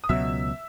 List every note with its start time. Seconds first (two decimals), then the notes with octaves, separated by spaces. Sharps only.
0.04 D#6
0.09 C#2 B2 F#3 E5 E6